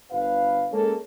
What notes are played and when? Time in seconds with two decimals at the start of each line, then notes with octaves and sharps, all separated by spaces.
0.11 G1 B4 F5
0.71 G#3 A#3 C#4 A4